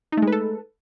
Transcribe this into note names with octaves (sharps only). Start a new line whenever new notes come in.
G#3 A3 D#4 A4 B4